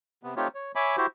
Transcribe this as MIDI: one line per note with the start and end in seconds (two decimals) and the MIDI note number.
0.23 0.34 48
0.23 0.34 59
0.36 0.48 57
0.36 0.48 60
0.36 0.48 63
0.36 0.48 65
0.36 0.48 67
0.36 0.48 73
0.55 0.72 73
0.75 0.96 73
0.75 0.96 76
0.75 0.96 80
0.75 0.96 83
0.75 0.96 86
0.97 1.07 64
0.97 1.07 66
0.97 1.07 67
0.97 1.07 72